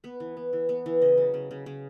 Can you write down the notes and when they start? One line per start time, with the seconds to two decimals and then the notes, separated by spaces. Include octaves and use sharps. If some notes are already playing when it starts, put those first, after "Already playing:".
0.04 B3 B4
0.20 E3
0.37 B3
0.53 E3
0.69 B3
0.86 E3
1.01 C#3 D#5
1.18 F#3
1.34 C#3
1.51 C#3
1.66 C#3